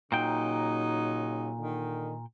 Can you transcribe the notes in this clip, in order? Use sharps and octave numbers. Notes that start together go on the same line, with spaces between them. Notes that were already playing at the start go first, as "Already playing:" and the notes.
A#2 C#3 F#3 D#4 G5
D3 D#3